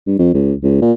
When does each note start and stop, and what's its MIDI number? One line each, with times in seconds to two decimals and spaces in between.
0.07 0.17 43
0.19 0.30 41
0.34 0.54 37
0.63 0.77 37
0.82 0.92 46